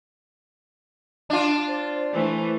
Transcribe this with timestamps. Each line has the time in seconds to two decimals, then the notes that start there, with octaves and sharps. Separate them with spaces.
1.30 D4 F4
1.68 C5
2.12 E3 A3